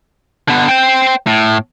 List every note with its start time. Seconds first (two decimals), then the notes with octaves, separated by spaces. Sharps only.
0.48 D3 B3
0.68 C5 G5
1.27 A2